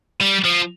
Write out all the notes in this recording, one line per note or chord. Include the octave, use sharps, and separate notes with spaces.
G3
F3